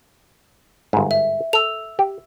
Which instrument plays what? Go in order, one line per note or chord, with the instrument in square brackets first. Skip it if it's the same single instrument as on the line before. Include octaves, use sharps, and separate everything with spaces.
[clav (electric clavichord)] G1 G#2
[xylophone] E5
[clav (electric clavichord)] A4 [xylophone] E6 F7
[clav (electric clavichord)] G4